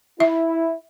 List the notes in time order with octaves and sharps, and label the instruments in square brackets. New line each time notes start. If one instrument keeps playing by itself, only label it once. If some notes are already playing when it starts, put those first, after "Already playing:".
[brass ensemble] E4 [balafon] E5